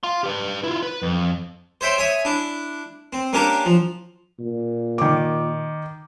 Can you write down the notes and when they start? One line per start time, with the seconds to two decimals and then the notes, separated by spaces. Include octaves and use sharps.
0.03 F5 C6
0.24 G4 B4
0.64 E4 F4
0.83 B4
1.02 F2
1.81 C5 C#5 E5 G5 C6
1.98 C#5 E5 G#5 D#6
2.25 D4 E4
3.13 C4
3.33 A#3 C#4 D4 G4 A#4 A5
3.65 F3
4.40 A#2
4.98 D#3 D6